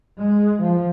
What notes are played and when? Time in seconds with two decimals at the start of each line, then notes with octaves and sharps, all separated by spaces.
0.16 G#3
0.61 F3